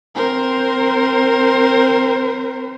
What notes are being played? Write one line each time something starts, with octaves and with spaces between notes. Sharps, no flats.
C4 A#4 C5